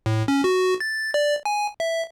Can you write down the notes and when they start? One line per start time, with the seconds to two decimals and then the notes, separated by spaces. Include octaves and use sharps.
0.06 A2
0.28 C#4
0.44 F#4
0.80 A6
1.14 D5
1.45 G#5
1.80 E5